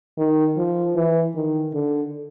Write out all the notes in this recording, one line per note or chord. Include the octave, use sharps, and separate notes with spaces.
D#3
F3
E3
D#3
D3